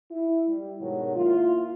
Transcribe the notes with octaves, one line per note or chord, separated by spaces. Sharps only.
E4
G3
G#2 B2 D#3 F#3
A#3 E4 F4